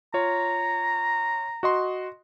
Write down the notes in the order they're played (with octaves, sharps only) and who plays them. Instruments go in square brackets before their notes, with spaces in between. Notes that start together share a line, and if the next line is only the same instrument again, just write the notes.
[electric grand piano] F4 C#5 [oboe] A#5
[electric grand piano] F#4 D#5 C6